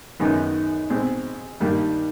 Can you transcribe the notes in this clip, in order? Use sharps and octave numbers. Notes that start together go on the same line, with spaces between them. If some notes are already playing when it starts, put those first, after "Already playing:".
F#2 D#3 G#3 B3 D#4
B2 G#3 C4
G2 D#3 G3 A#3 D4